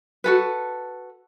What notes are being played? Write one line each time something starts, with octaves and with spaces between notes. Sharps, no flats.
F#4 A4 B4